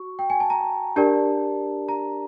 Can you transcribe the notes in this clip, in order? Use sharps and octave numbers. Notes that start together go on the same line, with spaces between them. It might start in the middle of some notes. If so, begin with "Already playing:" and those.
Already playing: F#4 C#6
G5
G#5
A5
A#5
D4 G4 A#4 D5 A5
A#5